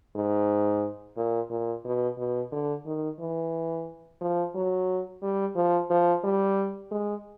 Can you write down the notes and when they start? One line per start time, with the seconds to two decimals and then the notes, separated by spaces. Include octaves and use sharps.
0.16 G#2
1.17 A#2
1.50 A#2
1.85 B2
2.18 B2
2.52 D3
2.86 D#3
3.19 E3
4.21 F3
4.55 F#3
5.22 G3
5.56 F3
5.90 F3
6.24 G3
6.91 G#3